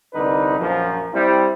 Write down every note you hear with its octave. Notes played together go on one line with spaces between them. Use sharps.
C2 D3 D#4 B4
A#1 F#2 F3
G3 C4 E4